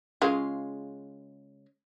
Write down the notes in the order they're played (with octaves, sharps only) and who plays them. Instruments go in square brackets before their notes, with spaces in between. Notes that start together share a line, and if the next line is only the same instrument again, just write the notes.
[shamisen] C#3 G#3 F4